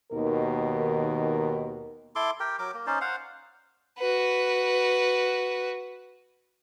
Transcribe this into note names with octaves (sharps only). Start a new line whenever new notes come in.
D#2 B2 D#3 A#4
E4 A4 C6 D6
G4 A#4 G5
F#3 A#4 D6
A#3
C#4 D#4 C5 D5
C5 F5 F#5
F#4 B4